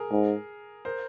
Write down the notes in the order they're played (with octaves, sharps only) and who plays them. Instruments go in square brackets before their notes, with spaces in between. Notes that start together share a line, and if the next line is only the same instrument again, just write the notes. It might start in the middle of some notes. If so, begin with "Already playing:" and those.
Already playing: [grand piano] G#4 A#4
[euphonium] G#2
[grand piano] A#4 C5